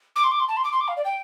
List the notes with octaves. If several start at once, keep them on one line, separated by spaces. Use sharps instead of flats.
D6
C6
D6
C6
A5
C6
D6
C6
D6
F5
D5
G5